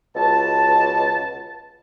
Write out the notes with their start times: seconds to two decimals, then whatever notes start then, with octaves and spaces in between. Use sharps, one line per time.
0.15 C#2 B2 A5